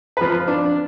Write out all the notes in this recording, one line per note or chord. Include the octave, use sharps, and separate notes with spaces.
F3 B4
D4